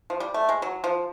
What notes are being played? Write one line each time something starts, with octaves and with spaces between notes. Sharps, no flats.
F3
G3
A3
G#3
F#3
F3